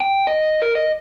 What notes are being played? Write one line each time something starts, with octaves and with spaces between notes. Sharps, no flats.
G5
D#5
A#4
D#5